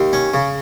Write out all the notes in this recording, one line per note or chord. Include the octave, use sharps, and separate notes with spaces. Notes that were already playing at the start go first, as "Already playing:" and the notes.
Already playing: D#2
C#4
C#3